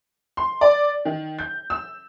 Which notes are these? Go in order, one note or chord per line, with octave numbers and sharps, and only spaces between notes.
C6
D5
D#3
G6
E6